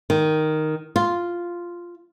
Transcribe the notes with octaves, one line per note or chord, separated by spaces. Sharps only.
D#3
F4